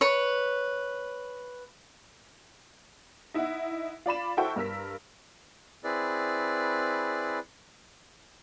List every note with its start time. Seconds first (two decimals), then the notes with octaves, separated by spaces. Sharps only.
0.01 B4 C#5
3.34 D#4 E4 E5 F#5
4.06 F4 D5 B5 E7
4.37 E4 F#4 A4 C5 G5 C#6
4.56 G2 A#4 E6 B6
5.84 C4 E4 G#4 B4 D5